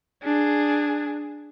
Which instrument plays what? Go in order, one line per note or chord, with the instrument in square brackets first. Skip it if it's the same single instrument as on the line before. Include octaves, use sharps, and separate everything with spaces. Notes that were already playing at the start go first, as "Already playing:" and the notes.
[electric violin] D4 G#4